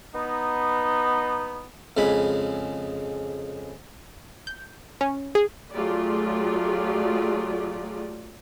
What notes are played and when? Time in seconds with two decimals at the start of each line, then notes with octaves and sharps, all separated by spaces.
0.15 B3 D#4
1.97 F2 C#3 G#3 B5
4.47 G6
5.01 C#4
5.35 G#4
5.73 F#3 A3 F4 G4 G#4 D5